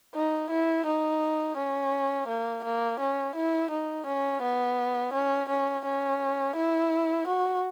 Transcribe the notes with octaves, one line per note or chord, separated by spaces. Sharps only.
D#4
E4
D#4
C#4
A#3
A#3
C#4
E4
D#4
C#4
B3
C#4
C#4
C#4
E4
F#4